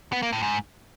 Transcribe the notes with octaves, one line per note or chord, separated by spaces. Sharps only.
B3
A#3
A2
G#2